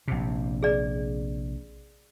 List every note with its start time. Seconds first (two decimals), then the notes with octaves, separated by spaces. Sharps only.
0.08 A#1 C3
0.63 G#4 D5